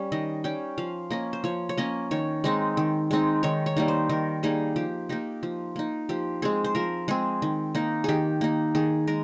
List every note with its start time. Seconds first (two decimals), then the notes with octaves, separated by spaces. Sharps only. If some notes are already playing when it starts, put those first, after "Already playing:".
Already playing: G3 C#4
0.12 D#3 D#5
0.44 G3 C#4 G5
0.78 F3 F5
1.10 A#3 C#4 D#5
1.33 C5
1.44 F3 C#5
1.69 C#5
1.77 A#3 C#4 D#5
2.11 D#3 C#5
2.44 G#3 C4 D#4
2.77 D#3
3.11 G#3 C4 D#4
3.43 D#3 C#5
3.66 C#5
3.76 G3 A#3 D#4
3.88 C5
4.09 D#3 A#4
4.43 G3 A#3 D#4 G#4
4.76 F3 G4
5.09 A#3 D#4 G4
5.43 F3
5.76 A#3 D#4
6.09 F3 G4
6.42 G#3 C4 G#4
6.64 C5
6.75 F3 A#4
7.08 G#3 C4 G#4
7.42 D#3
7.75 A#3 D#4
8.04 D#3 G4 G#4
8.41 A#3 D#4
8.75 D#3 G#4
9.07 G#3 A#4